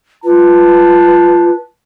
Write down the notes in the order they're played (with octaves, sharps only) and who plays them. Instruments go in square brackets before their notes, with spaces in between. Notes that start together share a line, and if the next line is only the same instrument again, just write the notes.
[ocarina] F4 [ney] B4 [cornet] A5